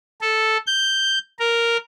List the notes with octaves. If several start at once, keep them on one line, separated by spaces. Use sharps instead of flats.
A4
G6
A#4